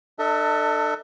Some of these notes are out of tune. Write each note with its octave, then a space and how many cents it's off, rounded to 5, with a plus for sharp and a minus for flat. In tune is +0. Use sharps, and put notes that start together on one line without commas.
D4 +35 A4 +25 E5 -35